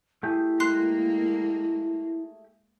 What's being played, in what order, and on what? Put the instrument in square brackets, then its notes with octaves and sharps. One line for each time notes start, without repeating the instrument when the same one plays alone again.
[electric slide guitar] A3 G4 G#4 [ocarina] E4
[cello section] G#3 A#3 [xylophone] C6 F#6 C7